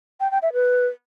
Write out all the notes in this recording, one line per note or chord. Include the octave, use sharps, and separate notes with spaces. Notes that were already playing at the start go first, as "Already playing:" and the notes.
G5
G5
E5
B4